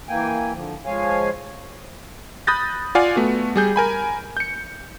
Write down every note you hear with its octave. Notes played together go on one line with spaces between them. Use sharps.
E3 A#3 G5 G#5
D3 F3
F3 G#3 C#5 F5 G#5
B5 D#6 F#6 G6 A6 A#6
F4 D5 F5 F#5 G#5
A3 B3 F#4
G3 G#4 G6
A#4 G#5 B5
G6 C#7